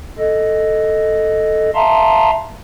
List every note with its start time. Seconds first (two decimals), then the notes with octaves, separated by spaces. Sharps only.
0.18 A4 D#5
1.75 E5 F5 A5 A#5 C6